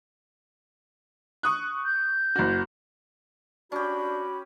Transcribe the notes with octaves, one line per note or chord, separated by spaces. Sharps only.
C#6 D#6 F#6
G6
F#1 F#4
C#4 D4 F#4 G4 B5